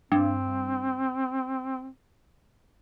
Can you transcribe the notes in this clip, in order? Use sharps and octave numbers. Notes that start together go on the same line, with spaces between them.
G2 C4